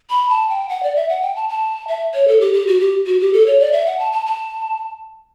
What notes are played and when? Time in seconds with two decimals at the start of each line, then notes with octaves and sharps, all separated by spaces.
0.10 B5
0.29 A5
0.49 G5
0.69 F#5
0.83 D5
0.96 E5
1.09 F#5
1.22 G5
1.36 A5
1.49 A5
1.88 E5
2.14 C#5
2.28 A4
2.41 G4
2.54 G4
2.67 F#4
2.80 G4
3.06 F#4
3.20 G4
3.33 A4
3.46 C#5
3.60 D5
3.72 E5
3.86 F#5
3.99 A5
4.12 A5
4.26 A5